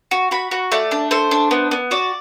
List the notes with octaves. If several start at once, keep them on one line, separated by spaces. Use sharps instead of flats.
F#4
F#4 B5
F#4
A3 D5
D4
A3 C5
D4
B3
B3
F#4 D5